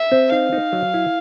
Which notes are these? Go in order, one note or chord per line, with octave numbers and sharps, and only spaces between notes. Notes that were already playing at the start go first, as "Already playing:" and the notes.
Already playing: E5
C4
D#4 F5
D#4
F#3
E4